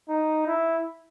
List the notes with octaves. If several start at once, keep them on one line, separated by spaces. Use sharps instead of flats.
D#4
E4